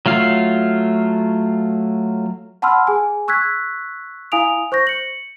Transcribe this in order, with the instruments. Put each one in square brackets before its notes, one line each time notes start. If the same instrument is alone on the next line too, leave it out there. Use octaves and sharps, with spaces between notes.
[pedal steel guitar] F#3 A3 F4 F5
[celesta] F#5 A5 B5 C6 E6 F6
G#4 G#5
C#6 E6 F#6 G#6 B6
E4 F5 G#5 D#6 D7 F7
C5 C#6 G6 A#6
C#7 F#7